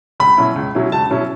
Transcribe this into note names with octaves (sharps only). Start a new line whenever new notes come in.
C#2 B5
B2 F#3 C#4 E4
C#2
B2 F#3 C#4 E4
C#2 A5
B2 F#3 C#4 E4